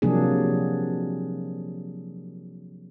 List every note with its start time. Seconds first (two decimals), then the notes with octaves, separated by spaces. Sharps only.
0.02 C3 F3 F#3 A#3 D4 G#4